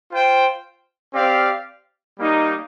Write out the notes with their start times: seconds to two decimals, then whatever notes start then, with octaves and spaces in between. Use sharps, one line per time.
0.11 F4 C5 G5
1.14 C4 G4 D5 F5
2.19 G3 A#3 D#4